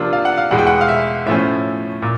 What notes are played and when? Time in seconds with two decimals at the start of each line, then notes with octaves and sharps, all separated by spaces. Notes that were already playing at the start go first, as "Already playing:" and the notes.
Already playing: C3 F3 A#3 D4 F4
0.13 F5
0.25 F#5
0.38 F5
0.51 E2 B2 G#3 F#5
0.58 G5
0.67 F#5
0.81 F5
0.88 E5
1.26 A2 F3 A3 C#4 E5
2.02 A#2